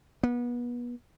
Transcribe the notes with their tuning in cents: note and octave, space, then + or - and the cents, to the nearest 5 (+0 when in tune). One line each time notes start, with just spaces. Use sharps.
B3 -30